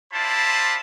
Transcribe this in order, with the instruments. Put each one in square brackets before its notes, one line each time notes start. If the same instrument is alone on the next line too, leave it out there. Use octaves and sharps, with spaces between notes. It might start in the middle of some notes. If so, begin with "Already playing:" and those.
[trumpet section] E4 F4 C5 D5 A5 B5